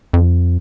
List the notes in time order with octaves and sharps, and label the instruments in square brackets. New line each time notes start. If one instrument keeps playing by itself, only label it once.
[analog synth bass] F2